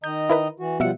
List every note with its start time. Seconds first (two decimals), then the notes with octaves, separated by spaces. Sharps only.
0.04 D#3 D#5 A#5 G6
0.30 E4 A#4 B4
0.60 E3 F#4
0.80 B2 F3 G3 E5 F#5 C#7